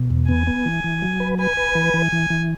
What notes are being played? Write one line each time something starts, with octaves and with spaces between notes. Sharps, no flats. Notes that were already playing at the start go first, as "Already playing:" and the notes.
Already playing: B2
E2
B3 G#5
B3
E3
E3
F#3
B4
B4 G#5
B4
E3
E3
E3
E3